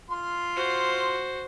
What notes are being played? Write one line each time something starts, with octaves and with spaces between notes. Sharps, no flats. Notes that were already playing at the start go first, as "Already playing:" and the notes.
F4 C6
F#4 C5